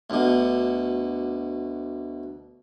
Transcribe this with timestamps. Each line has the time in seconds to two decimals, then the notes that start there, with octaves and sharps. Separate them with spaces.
0.10 D2 B2